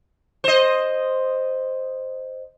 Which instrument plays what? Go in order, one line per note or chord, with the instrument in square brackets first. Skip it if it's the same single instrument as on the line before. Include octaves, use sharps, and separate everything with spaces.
[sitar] C5 D#5